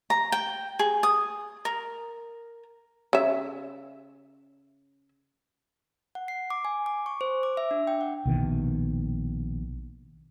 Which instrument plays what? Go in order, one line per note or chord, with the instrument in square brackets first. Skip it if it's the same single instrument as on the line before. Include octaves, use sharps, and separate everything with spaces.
[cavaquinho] A#5
G5
G#4
D#6
A#4
[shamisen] C#3 E5
[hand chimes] F#5
C7
D6
G#5
D6
C#6
C5
D6
E5
D4
G5
F#5
[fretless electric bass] A#1 B2 D#3